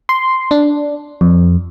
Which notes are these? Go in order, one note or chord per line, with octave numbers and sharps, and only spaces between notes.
C6
D4
F2